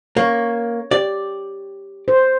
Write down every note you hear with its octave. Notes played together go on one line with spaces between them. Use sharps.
A#3 C#5
G4 D5
C5